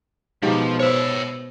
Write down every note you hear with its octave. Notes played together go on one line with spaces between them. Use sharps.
B2 F3 G#3 D#4 G4
C5 C#5 E5